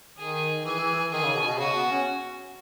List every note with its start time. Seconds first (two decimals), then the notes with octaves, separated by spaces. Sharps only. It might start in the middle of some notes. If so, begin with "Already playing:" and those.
0.17 D#3 G#4
0.65 E3 G#4
0.80 E3
0.96 E3
1.12 D#3 G#4
1.23 C#3
1.35 B2
1.47 B2
1.58 C#3 F#4
1.75 B3
1.91 C#4